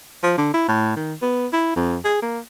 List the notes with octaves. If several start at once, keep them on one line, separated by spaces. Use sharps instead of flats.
F3
D3
E4
A2
D#3
B3
E4
F2
G#4
A#3